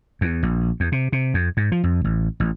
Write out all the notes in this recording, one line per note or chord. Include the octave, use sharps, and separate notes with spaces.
E2
A#1
E2
C3
C3
F2
G#2
F3
F2
A1
A1